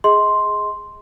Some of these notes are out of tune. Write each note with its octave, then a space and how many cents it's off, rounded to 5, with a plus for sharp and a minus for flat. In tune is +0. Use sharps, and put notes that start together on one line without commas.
G#4 +0 D#5 +25 C6 +0